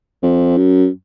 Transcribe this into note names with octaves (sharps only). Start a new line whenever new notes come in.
F2
F#2